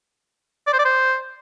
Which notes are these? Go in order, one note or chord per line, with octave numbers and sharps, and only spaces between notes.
D5
C5
D5
C5